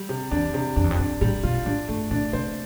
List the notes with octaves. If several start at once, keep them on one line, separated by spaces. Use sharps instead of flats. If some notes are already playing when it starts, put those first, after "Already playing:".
Already playing: G3
C3
E2 D4
C3
F2 D4
E2
F2
G2 D4
A2 G3
B2 F4
A2 D4
G2 A3
A2 D4
C3 C5